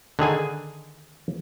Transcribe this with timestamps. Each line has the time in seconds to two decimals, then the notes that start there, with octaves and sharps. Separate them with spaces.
0.19 D3 D#3 G#4 G#5